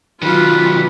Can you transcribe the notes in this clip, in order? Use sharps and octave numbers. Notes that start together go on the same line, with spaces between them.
D#3 F#3 F4 B4